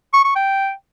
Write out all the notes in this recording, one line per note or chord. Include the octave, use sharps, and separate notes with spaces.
C#6
C#6
G5